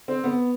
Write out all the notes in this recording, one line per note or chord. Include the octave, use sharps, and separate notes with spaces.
C4
B3